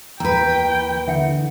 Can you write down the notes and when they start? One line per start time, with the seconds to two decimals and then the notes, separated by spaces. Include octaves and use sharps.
0.20 D#2 E3 B4 G5 A#5
1.08 D3 E3 E5 F#5 C#7